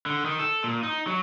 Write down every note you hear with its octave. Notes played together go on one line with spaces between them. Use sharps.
D3
D#3
A4
A#2
D#4
F#3